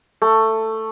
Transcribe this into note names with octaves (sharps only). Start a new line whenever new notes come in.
A3